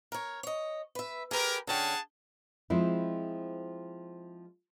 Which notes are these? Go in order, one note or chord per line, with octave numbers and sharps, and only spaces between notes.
A#4 C#5
C#5 D#5
B4 E5
G4 G#4 A#4 B4
D3 C#4 G#4 F#5 G5 A5
F3 G#3 C4 E4